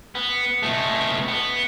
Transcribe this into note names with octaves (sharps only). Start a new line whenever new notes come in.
B3
B2 A3
B3